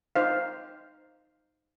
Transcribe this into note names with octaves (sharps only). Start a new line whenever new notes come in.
D#4 C5 F5